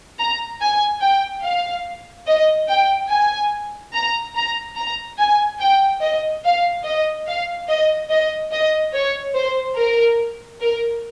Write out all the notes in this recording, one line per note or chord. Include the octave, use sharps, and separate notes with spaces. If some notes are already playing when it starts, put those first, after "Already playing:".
A#5
G#5
G5
F5
D#5
G5
G#5
A#5
A#5
A#5
G#5
G5
D#5
F5
D#5
F5
D#5
D#5
D#5
C#5
C5
A#4
A#4